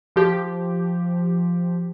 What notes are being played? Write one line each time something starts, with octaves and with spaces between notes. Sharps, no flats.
F3 G4